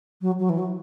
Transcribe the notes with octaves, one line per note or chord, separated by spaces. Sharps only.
F#3
F#3
E3
F#3